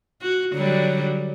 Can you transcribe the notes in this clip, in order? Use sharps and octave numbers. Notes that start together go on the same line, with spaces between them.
F#4
D3 F#3 G3